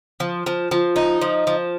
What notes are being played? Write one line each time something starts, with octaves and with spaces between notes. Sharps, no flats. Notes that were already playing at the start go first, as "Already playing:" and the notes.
F3
F3
F3
D#4
F3
F3